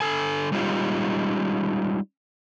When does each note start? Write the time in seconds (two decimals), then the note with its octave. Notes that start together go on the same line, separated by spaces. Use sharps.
0.01 D3 A4 G#5
0.52 G3 G#3 C#4 D#4 F4 G4